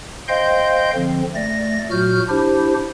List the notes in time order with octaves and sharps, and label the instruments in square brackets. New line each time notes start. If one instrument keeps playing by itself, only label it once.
[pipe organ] C5 D#5 F5 G5 C6 G6
D3 F3 C4
A3 D5 A#6
A#2 F#3 F#4 F6 G6
D4 E4 G4 C5